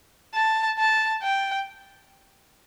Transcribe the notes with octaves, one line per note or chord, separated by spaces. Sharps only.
A5
A5
G5